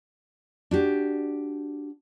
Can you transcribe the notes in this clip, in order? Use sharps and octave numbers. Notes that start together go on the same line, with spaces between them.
D4 F#4 G4